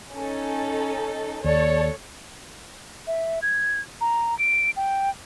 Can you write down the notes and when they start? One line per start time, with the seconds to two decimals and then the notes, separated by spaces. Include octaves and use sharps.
0.14 C#4 D#4 A4
1.44 D#2 A4 C#5 D5
3.07 E5
3.42 G#6
4.01 A#5
4.39 D7
4.76 G5